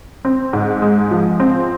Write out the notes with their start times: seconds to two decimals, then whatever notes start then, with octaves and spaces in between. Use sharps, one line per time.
0.25 C4
0.53 G#2
0.82 G#3
1.11 F3
1.40 C4